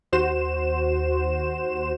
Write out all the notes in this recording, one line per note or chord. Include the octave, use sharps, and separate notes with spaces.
D#2 F#4 C5 E7